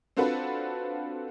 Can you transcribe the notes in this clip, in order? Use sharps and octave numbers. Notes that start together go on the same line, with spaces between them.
C4 D4 F4 F#4 A4 B4